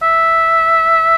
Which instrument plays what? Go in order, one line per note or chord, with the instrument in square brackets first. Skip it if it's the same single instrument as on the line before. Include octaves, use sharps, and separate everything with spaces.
[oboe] E5